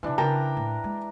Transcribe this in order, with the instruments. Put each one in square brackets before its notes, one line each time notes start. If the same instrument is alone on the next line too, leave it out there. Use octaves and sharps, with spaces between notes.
[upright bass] C3 D#3 [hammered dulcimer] E3 D4
[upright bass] C#3 [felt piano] A#4 G5 A5 [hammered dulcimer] A#5
[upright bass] A2
G#3